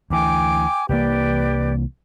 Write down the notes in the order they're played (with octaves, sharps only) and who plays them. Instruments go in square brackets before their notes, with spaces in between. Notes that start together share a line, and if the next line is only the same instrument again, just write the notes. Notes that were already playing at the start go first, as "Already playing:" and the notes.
[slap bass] D2 E3 [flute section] G5 G#5 D6
[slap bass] C2 E3 A#3 [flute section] G4 B4 D5